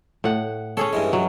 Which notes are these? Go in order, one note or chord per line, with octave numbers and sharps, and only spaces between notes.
A2 F#5
C#4 G#4 A4 C#5
G2 E3 G#3
F#3